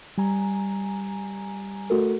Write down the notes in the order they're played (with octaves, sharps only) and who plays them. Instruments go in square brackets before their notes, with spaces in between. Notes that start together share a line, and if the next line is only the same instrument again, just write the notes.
[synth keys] G3 G#5 A#5
A3 F#4 A4 A#4